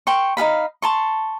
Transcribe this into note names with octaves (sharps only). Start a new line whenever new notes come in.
G5 C6 C#6
D#4 G#4 F5 B5
A5 C6 C#6